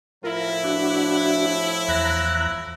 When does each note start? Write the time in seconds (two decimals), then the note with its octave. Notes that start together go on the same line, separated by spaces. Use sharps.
0.24 A2 F3 E4 F4 A#4
0.64 D4 F#4
1.88 E2 A#5 F#6